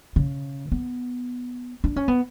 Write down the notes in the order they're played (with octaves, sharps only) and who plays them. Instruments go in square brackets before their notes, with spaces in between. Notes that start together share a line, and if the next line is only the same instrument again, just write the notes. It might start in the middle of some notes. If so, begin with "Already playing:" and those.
[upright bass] C#3
B3
D4
C#4
B3